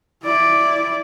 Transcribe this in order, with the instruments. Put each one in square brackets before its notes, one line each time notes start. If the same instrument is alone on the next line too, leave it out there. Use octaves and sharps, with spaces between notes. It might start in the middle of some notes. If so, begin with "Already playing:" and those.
[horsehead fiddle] E4 D5